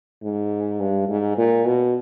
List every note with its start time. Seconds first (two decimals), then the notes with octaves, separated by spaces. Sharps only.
0.23 G#2
0.80 G2
1.08 G#2
1.37 A#2
1.66 B2